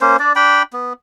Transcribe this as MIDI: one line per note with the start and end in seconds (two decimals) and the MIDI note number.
0.01 0.17 58
0.01 0.17 61
0.01 0.17 72
0.19 0.33 62
0.19 0.33 74
0.36 0.63 62
0.36 0.63 79
0.36 0.63 83
0.73 0.93 59